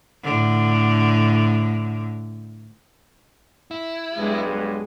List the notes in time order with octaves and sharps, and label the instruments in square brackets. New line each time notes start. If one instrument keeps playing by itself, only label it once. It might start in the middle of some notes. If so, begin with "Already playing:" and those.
[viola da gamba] A2 D3
[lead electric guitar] E4
[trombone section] B1 G2 B4 [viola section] G#3